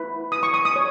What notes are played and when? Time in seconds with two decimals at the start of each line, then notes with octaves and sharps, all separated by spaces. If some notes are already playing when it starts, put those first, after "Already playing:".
Already playing: E4 B4
0.32 D#6
0.43 C#6
0.54 D#6
0.65 D#6
0.76 C#5